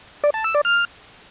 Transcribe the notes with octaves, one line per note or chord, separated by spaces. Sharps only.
D5
A5
E6
D5
F6